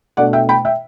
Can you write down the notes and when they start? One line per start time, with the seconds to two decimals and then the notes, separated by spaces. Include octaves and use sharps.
0.17 B2 A3 D4 D5 F#5
0.33 E5 G5
0.49 G5 B5
0.65 E5 G5